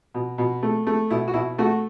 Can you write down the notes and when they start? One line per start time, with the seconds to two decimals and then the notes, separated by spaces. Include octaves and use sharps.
0.14 B2
0.38 B2
0.63 A3
0.87 A3
1.10 B2 E4
1.28 F#4
1.34 B2 E4
1.58 A3 F#4